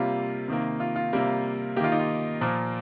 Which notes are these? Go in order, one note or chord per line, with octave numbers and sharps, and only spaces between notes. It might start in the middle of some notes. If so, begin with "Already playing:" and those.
Already playing: C3 G3 A#3 F4
C3 D#3 A#3
F4
F4
C3 G3 A#3
D#3 A#3 F4 G4
D#4
F4
A#2 F3 A#3